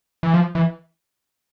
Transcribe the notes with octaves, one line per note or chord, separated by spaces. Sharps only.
E3
F3
E3